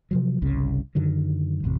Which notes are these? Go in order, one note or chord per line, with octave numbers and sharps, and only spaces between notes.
C3 F3 F#3
G1 C2 C#3
F#2 D3 D#3 F#3
A1 F2 C3